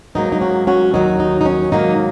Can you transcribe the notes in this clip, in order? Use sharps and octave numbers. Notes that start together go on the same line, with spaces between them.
G#2 F#3 A#3 D#4
D#4
C#4 F#4
C#4 F#4
D#2 D#3 F#3 D#4
D#4
D#4
C#4
G#2 D#3 F#3 A#3 D#4